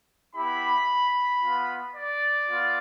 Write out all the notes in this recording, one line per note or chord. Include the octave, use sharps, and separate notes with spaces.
B3 E4 G4 B5
B3 F4
D5
B3 F4